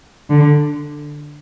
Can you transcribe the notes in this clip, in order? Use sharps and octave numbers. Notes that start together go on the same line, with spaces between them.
D3